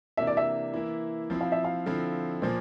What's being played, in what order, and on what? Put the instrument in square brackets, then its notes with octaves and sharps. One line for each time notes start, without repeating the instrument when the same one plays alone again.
[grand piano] C3 E3 A#3 D4 [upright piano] E5
[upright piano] D5
E5
[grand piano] E3 A#3 E4
F3 C4 E4
[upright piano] F5
E5
F5
[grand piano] D3 F3 C4 E4
[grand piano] A#2 F3 A#3 [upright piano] C5